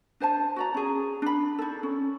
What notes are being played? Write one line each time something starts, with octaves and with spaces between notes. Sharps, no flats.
D4 C5 G#5 A5
F#4 D5 A#5
C#4 G#4
D4 B5
D#4 A4
C#4